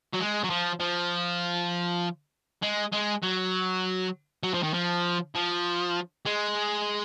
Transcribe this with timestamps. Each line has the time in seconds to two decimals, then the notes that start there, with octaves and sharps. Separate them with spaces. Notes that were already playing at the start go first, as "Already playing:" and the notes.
0.13 F#3
0.19 G#3
0.44 F#3
0.50 F3
0.80 F3
2.62 G#3
2.92 G#3
3.22 F#3
4.43 F#3
4.54 F3
4.63 D#3
4.74 F3
5.35 F3
6.26 G#3